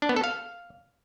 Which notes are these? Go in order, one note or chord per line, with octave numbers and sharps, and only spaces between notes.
D4
B3
A4
F5